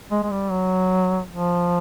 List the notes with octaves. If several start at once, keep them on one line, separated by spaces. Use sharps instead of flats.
G#3
G#3
G3
F#3
F3